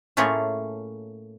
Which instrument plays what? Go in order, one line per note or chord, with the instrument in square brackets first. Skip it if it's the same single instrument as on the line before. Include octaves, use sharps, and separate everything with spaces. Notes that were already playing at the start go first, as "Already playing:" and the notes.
[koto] A2 A3 A#3 C#4 F4 G#4